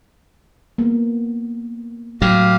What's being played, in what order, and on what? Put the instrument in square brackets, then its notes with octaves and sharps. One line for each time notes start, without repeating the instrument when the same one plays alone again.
[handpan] A#3 B3
[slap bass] A2 F#3 [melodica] G4 F5